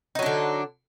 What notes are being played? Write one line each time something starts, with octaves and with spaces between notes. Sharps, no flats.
D3 F#3 D4 D#4